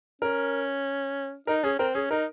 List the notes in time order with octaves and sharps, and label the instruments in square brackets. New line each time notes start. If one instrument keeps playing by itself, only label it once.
[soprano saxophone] C#4 [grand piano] A#4
[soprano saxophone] D#4 [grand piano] A#4
[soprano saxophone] C#4 [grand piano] G#4
[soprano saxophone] C4 [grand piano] A#4
[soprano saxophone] C#4 [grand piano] G#4
[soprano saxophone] D#4 [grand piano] A#4